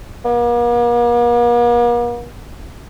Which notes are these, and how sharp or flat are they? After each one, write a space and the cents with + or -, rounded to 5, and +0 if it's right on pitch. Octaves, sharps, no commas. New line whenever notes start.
A#3 +45